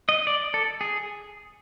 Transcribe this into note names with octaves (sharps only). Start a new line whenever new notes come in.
D#5
D5
A4
G#4